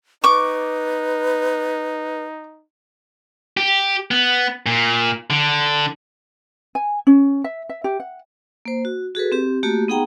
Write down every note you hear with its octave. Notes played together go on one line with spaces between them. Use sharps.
D#4 B4 C#6 D6
G4
B3
A#2
D3
G#5
C#4
E5
E5
G4
F#5
A#3 C5
F#4
F#4 G#4 A4 B4
C4 G4
A3 A#3 F#4 G4
B3 D#4 G#4 F#5 G5 A#5